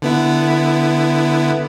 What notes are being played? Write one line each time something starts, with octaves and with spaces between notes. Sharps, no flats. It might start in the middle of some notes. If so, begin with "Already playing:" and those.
D3 B3 E4